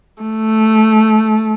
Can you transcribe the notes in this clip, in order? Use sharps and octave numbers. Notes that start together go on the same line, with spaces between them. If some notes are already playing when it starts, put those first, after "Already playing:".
A3